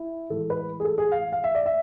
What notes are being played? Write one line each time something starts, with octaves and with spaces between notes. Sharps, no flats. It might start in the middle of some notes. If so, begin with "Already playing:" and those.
Already playing: E4
A2 E3 G#3 A4
B4
G#4
A4
G#4
F5
F5
E5
D5
E5